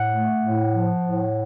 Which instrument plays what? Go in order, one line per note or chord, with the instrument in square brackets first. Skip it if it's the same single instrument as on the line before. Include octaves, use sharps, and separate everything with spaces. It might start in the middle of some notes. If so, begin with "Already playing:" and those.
Already playing: [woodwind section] A2 [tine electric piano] F#5
[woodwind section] A3
A2
F3
A2